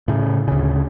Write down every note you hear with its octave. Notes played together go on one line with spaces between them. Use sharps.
A2 C#3
D2 C#3